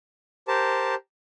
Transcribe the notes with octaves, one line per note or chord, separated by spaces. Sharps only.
G4 A#4 C5 A5